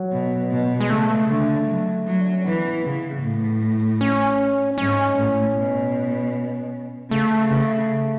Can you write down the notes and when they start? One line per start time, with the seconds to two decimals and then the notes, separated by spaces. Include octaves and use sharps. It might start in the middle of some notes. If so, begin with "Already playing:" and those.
Already playing: F#3
0.12 B2
0.51 B2
0.80 G#3
0.90 C#3 A3
1.29 D3
1.67 F#3
2.07 F#3
2.21 D4
2.33 C#4
2.45 E3 B3
2.84 C#3
3.23 A2
4.01 C#4
4.78 G#2 C#4
5.17 A2
5.56 B2
7.11 C#3 A3
7.50 C#3